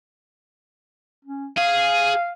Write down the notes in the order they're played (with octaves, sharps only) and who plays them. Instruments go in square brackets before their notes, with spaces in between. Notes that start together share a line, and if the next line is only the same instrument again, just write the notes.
[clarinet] C#4
[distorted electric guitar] G#4 [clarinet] F5